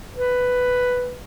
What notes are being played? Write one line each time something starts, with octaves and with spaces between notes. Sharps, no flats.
B4